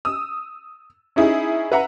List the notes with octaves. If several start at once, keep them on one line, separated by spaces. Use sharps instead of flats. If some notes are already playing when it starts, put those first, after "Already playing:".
D#6 E6
C#4 D#4 E4 G#4
B4 E5 F#5 A#5